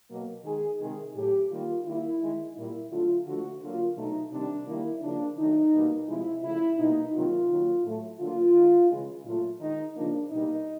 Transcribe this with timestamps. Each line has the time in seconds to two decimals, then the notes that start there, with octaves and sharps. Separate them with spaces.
0.09 B2 F#3 A#3
0.45 D#3 G#3 G#4
0.80 C3 D#3 G#3 G#4
1.15 A2 F#3 A3 G4
1.51 D#3 G3 A#3 F4
1.85 D#3 G3 A#3 E4
2.21 D#3 G#3
2.56 A#2 G3 A#3 E4
2.91 D3 F#3 A3 F4
3.26 D3 F3 A3 F#4
3.62 D3 F#3 A#3 F4
3.97 B2 F#3 A3 D#4
4.32 C3 D#3 G3 D4
4.67 D#3 G3 A#3 E4
5.02 C#3 F3 A#3 D4
5.37 D#3 F#3 A3 D#4
5.73 B2 G3 A#3
6.08 C3 F3 G#3 E4
6.43 C#3 F3 A3 E4
6.78 B2 G3 A#3 D#4
7.14 C3 D#3 F#3 A#3 F4
7.49 D#3 F#3 A#3
7.84 A2 F#3 A3
8.19 D3 F#3 A#3 F4
8.55 D#3 G#3
8.90 C#3 E3 G#3
9.25 A#2 F#3 A3 F4
9.60 D#3 G#3 D#4
9.95 C#3 F3 A#3 D4
10.31 B2 G3 A#3 D#4